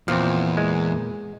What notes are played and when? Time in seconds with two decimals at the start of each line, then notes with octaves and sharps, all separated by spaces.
0.08 E2 A#2 F3 C4
0.57 G#3